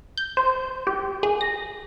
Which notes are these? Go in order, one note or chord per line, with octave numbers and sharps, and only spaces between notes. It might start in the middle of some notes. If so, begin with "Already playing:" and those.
G6
C5
G4
G#4
A#6